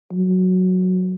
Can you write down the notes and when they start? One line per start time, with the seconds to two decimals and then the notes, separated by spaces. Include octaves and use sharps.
0.13 F#3